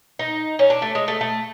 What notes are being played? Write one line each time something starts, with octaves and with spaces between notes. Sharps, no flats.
D#4
C#4
D4
A3
G#3
A3
A3